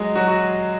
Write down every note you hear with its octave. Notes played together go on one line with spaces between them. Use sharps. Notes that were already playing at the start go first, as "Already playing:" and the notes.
Already playing: F#3 G#3 F#4 G#4
F#3 F#4
F#4